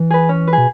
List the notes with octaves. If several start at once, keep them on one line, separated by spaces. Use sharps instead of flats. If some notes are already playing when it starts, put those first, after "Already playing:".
Already playing: E3
G#4 B4
C#4
B4
G#4
B2